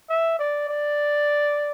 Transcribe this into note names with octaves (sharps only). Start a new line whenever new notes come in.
E5
D5
D5